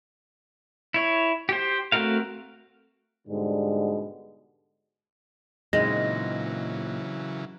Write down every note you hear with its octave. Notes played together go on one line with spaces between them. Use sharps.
E4 C#5
G4 C5
A3 C4 F#4 A#4 F5
G#2 B2 D3 G3 G#3
A#2 C#3 E3 F#3 G#3 C4 D#4 A#6